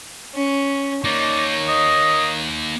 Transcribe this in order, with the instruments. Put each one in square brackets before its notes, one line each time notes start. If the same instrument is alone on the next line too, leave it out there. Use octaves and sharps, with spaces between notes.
[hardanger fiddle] C#4
[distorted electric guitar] A#3 D#4 [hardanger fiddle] C#5 [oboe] D5
[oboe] D#5